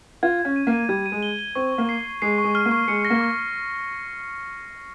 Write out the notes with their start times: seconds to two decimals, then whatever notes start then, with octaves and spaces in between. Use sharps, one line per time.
0.23 F4 G#6
0.39 G#6
0.45 C#4
0.56 D#7
0.67 A#3
0.73 D#7
0.89 G3 G#6
1.06 D#7
1.12 G#3
1.23 G7
1.39 G7
1.55 C4 C#6
1.72 C#6
1.78 A#3
1.89 C7
2.06 C7
2.22 G#3 C7
2.38 C#6
2.44 G#3
2.55 F6
2.66 A#3
2.72 C#6
2.88 G#3 C#7
3.05 A#6
3.10 A#3
3.21 C#6